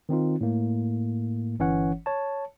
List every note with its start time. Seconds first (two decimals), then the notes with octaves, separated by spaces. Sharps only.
0.09 D#3 C4 D#4 F4
0.41 A2 A#3
1.59 G1 E3 C#4 C#5 F#5
2.06 C#5 A5